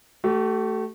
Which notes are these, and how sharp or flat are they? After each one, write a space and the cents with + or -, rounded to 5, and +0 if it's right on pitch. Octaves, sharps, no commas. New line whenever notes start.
A3 +0 G4 -45